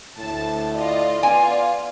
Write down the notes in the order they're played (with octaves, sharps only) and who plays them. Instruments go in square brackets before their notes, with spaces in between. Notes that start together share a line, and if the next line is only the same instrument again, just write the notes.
[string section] D2 A5 [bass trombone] A2
[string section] F4 D#5 [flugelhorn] D5
[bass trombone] B3 [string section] F4 [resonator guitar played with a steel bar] G#5